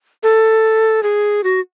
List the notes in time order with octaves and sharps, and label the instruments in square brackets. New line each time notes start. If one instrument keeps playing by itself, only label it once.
[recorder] A4
G#4
F#4